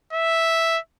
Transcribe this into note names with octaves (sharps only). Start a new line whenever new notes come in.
E5